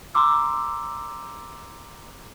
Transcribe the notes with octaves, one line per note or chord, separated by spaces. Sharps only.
A#5 C6 D6 E6